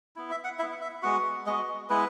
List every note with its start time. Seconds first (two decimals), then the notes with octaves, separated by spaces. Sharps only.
0.16 B3 E4
0.31 E5
0.44 F#5
0.59 E4 E5
0.63 B3
0.81 E5
1.03 G#3 B3 F#4 F#5
1.46 G#3 B3 F#4 D#5
1.89 G#3 B3 E4 B4